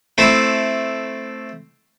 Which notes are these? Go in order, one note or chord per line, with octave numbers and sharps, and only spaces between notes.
A3 C4 E4